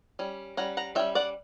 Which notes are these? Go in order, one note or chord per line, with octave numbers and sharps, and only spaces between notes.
G3 C#4
G3 C#4 F#5 A#5
F#5 A#5
G3 C#4 E5 G5
D5 F#5